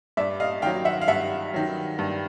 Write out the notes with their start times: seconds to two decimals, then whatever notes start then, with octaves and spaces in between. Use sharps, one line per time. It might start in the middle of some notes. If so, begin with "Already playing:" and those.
0.17 G2 D5 E5
0.40 D#5 F5
0.62 D#3 F#3 F5 G5
0.85 E5 F#5
1.01 F5
1.08 G2 E5 F#5
1.54 D#3 F#3
1.99 G2